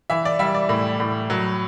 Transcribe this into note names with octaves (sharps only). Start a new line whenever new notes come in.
E3 E5
D5
G3 E5
D5
A2
A2
F#3